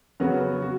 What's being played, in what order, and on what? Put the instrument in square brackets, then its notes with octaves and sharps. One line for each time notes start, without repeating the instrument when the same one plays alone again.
[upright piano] C#3 F#3 B3 F#4
F#4